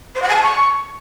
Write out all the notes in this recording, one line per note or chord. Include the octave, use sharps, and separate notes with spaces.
C5
F#5
G#5
A5
C#6